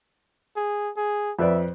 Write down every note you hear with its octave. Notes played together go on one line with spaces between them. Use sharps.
G#4
G#4
F2 B4 D5 E5